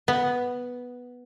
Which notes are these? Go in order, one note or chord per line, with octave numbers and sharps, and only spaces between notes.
B3